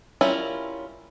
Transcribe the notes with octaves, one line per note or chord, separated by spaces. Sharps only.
G3 C#4 E4 F4 A#4